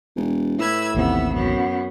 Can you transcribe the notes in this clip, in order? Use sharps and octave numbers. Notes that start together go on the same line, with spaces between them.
E1
A2 B4 E6 G#6
A1 D#2 C3 B3 E6
F#2 B3